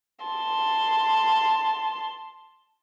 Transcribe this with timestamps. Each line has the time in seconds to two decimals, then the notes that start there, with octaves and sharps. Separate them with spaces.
0.26 A5 C6